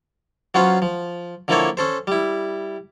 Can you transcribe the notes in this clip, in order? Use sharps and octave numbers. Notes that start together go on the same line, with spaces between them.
F#3 B3 C#4 F4 C5 F#5
F3
D3 F3 A#3 E4 A4 C#5
C#4 A4 C5
G3 E4